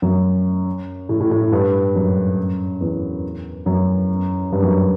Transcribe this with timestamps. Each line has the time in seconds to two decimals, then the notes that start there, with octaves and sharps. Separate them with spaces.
0.02 F#2
1.09 A2
1.20 A2
1.31 A2
1.52 G2
1.95 F#2
2.81 E2
3.66 F#2
4.52 G2
4.62 F#2